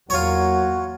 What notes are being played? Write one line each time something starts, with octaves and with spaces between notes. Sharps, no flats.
E2 F#3 A#3 F4 F#4 C#5